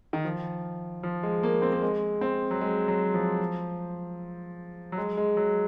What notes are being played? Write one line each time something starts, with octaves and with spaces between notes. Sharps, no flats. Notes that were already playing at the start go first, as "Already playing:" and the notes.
D#3
F3
F3
G#3
A#3
C4
A#3
G#3
C4
F#3
G#3
F#3
F3
F#3
G#3
G#3
F#3